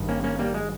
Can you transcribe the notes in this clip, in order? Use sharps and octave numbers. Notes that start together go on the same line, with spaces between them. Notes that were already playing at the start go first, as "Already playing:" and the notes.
Already playing: G#1 G2 D#3
A#3 C#4
A#3 C#4
G3 A#3
G#3